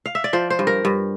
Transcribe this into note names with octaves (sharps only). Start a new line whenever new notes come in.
F5
E5
D5
F3 C5
C5
G2
A#4
G2